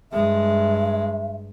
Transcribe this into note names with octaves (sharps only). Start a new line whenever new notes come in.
G2 G#3 E5